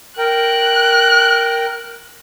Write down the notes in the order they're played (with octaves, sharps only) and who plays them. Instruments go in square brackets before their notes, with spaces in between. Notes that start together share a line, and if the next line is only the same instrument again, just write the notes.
[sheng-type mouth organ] A#4 G5 [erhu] F#6